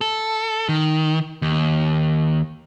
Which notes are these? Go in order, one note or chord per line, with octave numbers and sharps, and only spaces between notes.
A4
D#3
D#2